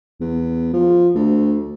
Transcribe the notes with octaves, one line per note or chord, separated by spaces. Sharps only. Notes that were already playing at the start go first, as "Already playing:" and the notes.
E2
F3
D2